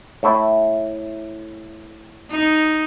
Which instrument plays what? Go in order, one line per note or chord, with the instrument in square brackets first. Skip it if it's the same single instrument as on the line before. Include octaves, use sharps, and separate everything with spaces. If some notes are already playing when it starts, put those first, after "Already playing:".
[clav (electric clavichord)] A2 A3 E4
[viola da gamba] D#4